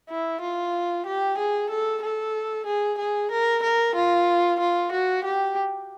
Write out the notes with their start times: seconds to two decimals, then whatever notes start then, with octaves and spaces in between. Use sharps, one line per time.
0.10 E4
0.41 F4
1.06 G4
1.38 G#4
1.70 A4
2.02 A4
2.67 G#4
2.99 G#4
3.31 A#4
3.63 A#4
3.95 F4
4.60 F4
4.92 F#4
5.24 G4